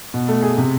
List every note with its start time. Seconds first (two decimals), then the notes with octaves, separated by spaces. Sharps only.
0.14 B2
0.28 A3
0.43 G#4
0.58 C3